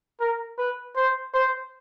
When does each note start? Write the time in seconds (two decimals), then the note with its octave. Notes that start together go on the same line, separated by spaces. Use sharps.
0.20 A#4
0.58 B4
0.96 C5
1.34 C5